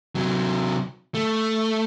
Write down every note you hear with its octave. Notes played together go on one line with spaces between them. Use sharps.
C3 F#3
A3